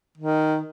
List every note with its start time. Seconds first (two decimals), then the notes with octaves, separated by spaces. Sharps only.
0.18 D#3